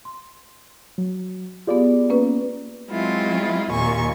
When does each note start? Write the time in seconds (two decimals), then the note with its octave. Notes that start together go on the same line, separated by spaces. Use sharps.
0.05 C6
0.98 F#3
1.67 B3 F4 G4 G#4 D5
2.10 A#3 C#4 B4
2.91 F#3 G#3 C4 E4 F4
3.72 D#2 A#2 G#5 C#6